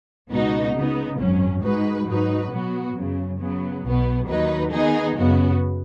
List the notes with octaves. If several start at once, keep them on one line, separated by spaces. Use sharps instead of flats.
C#2 B2 B3 D#4 F#4
C#3 B3 D#4
G#1 F#2 F#3 C#4
G#2 G#3 D#4 F#4 B4
G#2 F#3 D#4 F#4 B4
B2 F#3 B3 F#4
F#2 C#3 F#3
C#3 F#3 B3
B1 B2 B3
D#2 D#3 F#3 D#4 B4
D#3 B3 D#4 G#4
F#2 C#3 B3 F#4